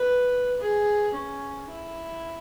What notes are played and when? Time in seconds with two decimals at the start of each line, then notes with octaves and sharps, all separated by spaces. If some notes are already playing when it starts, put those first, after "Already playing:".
Already playing: B4
0.60 G#4
1.15 C#4
1.70 E4